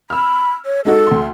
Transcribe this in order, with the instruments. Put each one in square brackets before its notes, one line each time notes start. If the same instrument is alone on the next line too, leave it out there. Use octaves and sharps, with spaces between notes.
[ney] B5 [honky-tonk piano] E6 F6
[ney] C#5
[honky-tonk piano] G#3 D#4 F#4 [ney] A4
[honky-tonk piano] D2 C6